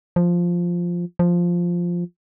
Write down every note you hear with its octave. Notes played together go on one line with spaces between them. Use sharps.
F3
F3